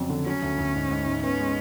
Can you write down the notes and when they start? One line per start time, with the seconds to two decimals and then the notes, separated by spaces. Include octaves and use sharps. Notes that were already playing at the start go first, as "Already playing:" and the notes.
Already playing: F2 C#3 F#3
0.10 D3
0.26 F#3 C#4
0.42 D2
0.59 D2
0.75 G#2
0.91 G#2
1.06 G#2
1.23 B3 C#4
1.39 G#3